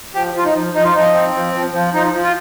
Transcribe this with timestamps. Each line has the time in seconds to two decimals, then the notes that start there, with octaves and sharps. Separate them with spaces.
0.14 F3 G4
0.34 F3 F4
0.45 D#4
0.55 F3
0.74 F3 D#4
0.84 F4
0.95 F3 D#4
1.14 C4
1.34 F3
1.55 F3
1.73 F3
1.94 F3 D#4
2.13 F3
2.24 F4